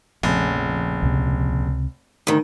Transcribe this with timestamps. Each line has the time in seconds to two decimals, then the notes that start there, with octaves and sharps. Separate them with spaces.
0.23 F1 A#1 C#3
1.02 C#2 C3
2.27 D2 D#3